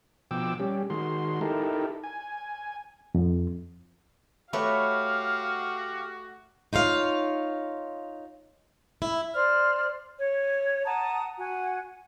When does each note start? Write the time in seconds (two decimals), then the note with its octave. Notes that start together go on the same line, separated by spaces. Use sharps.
0.31 B2 F3 G5 D6 E6
0.60 G3 C#4 G4
0.90 D#3 G#3 F#4 C6
1.41 D#4 E4 G4 A4 A#4
2.04 G#5
3.15 F2
4.53 A3 F#4 G4 B4 C#5 F5
6.73 D#4 F4 C#5 F5
9.02 E4
9.34 C5 D5 F6
10.20 C#5
10.86 F#5 A5 A#5 D#6
11.39 F#4 F#5 G#5